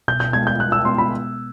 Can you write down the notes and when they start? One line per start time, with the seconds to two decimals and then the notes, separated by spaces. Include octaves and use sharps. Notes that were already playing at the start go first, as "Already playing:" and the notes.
0.08 B2 G6
0.20 G6
0.33 B3 G#6
0.36 G#3
0.47 G6
0.60 B2 F#6
0.72 E6
0.85 G#3 B3 C6
0.98 B5